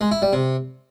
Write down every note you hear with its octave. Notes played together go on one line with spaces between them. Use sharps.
G#3
E4
G3
C3